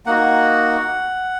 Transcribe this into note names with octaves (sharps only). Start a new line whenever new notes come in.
A#3 D#4 F#4 F#5